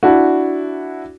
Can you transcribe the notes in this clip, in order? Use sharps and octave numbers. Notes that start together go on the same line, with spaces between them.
D4 E4 F#4